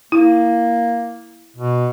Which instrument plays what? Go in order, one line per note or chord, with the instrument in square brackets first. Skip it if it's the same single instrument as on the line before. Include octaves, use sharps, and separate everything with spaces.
[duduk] A#3 [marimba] E4
[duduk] B2